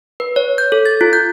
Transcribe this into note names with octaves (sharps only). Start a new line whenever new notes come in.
B4
C#5
G6
A4
A6
F4
G6